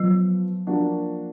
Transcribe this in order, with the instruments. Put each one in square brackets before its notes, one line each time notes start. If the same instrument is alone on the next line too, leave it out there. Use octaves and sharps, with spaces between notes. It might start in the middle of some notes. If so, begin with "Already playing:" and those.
Already playing: [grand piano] F3 B3 F4 [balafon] F#3
[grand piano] F3 A#3 D4 F#4